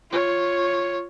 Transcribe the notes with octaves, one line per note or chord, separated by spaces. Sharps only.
F4 C#5